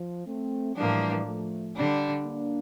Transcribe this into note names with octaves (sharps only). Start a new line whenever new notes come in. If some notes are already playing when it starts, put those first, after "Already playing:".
Already playing: F3
A3 C4
A2 E3 F3 G3 A#3 D4
F3 A3
D3 G3 D4
A#3 D4